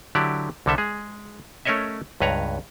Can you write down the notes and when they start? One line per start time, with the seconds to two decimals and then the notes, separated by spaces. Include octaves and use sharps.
0.15 D3 F#3 E4 G4 D5
0.66 C2 D3 G3 A4 E5
0.78 G#3 G#4
1.65 A3 C#4 A#4 C#5 D#5 E5
2.20 C#2 G2 B4 C#5 A#5